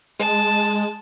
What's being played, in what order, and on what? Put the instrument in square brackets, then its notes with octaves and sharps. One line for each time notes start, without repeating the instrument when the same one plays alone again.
[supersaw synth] G#3 [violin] A5